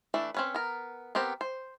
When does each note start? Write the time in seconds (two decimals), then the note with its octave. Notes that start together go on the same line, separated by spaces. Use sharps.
0.14 E3 A3 D4
0.34 C4 C#4 B4
0.55 B3 A#4
1.15 B3 C4 G4 A#4
1.41 C5